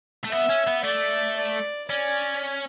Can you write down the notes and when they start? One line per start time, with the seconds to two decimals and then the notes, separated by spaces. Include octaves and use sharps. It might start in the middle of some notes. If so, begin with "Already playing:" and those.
0.24 A3
0.31 B3 E5
0.49 C#4
0.67 B3
0.84 A3 D5
1.37 D5
1.89 C#4 D5